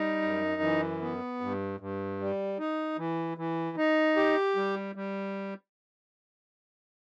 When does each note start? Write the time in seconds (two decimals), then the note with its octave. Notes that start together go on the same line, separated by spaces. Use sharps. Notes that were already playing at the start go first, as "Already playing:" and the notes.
Already playing: G3 D#4
0.22 F#2
0.62 E3
1.01 B3
1.41 G2
1.80 G2
2.20 G3
2.59 D#4
2.98 E3
3.38 E3
3.77 D#4
4.16 G4
4.56 G3
4.95 G3